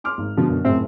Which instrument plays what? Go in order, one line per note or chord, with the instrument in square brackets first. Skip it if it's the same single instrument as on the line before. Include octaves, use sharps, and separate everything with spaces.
[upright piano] C6 D6 F6
G#1
[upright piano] B2 D3 [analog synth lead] F3
[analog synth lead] F#2
[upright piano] F#1 A2 E5 [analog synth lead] C4